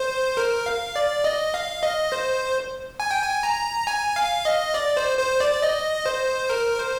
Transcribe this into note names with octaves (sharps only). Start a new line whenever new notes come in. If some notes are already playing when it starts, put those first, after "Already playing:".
Already playing: C5
A#4
F5
D5
D#5
F5
D#5
C5
G#5
G5
G#5
A#5
G#5
F5
D#5
D5
C5
C5
D5
D#5
C5
A#4
C5